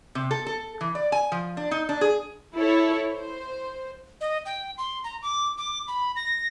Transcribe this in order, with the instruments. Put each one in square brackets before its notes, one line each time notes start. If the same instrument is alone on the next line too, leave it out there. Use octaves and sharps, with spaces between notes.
[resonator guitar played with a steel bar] C3
A4
A4
E3
D5
G#5
F3
D4
D#4
D4
G#4
[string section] E4 A4 C#5
C5
[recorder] D#5
G5
C6
A#5
D6
D6
B5
A#6